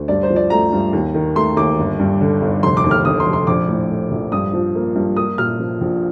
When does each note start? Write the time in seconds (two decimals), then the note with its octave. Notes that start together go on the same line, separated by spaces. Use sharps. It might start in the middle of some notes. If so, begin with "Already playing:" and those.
Already playing: D2
0.08 G2 D5
0.23 C5
0.30 F3
0.36 D5
0.50 A3 A#5
0.73 G2
0.93 D#2
1.14 D#3
1.35 A3 C6
1.57 D#2 D6
1.78 G1
1.99 G2
2.21 D3
2.42 G1
2.63 F1 C6
2.77 D6
2.84 D#2
2.91 F6
3.05 D3 D#6
3.20 C6
3.26 F1
3.33 C6
3.47 A#1 D6
3.68 A2
3.90 A3
4.11 A#1
4.32 G2 D#6
4.53 F3
4.75 A#3
4.95 G2
5.17 A#3 D#6
5.38 A#2 F6
5.60 F3
5.81 A#1